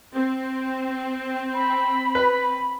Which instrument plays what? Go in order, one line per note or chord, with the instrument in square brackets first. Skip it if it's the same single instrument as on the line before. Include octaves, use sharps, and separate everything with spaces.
[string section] C4
[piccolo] B5
[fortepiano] B4